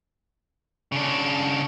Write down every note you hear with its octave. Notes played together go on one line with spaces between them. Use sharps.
C#3 D4